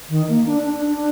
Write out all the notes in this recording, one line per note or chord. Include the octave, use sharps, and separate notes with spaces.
D#3
A#3
D4
D4
D4